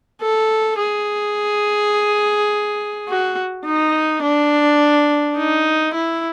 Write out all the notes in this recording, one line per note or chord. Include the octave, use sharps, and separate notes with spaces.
A4
G#4
F#4
D#4
D4
D#4
E4